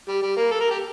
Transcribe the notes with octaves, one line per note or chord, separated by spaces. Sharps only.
G3
G3
A#3
A4
A#4
G4